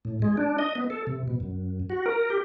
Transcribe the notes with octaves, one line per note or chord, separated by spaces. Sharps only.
A2
G#3
D4
D#5
B3
A4
C3
B2
F#2
F#4
A#4
G4